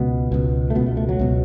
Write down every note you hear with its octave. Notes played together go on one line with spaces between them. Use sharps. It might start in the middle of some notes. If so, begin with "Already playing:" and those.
Already playing: C#2 B2 B3
C#2 B2
A3
C#2 B2 B3
A3
A3
F#3
C#2 B2